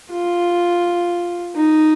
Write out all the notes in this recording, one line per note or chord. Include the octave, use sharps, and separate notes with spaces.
F4
D#4